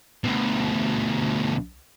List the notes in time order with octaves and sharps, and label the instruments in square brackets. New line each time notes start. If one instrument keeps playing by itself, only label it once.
[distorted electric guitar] D2 B2